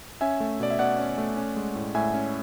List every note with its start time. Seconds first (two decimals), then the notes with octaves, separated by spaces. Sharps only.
0.21 C#4 E5 G#5
0.40 A3
0.60 B2 D5
0.71 E5
0.79 B2 D5 F#5
0.98 C#4
1.18 A3
1.37 C#4
1.56 G#3
1.76 A2
1.95 A2 E5 G#5
2.14 C#4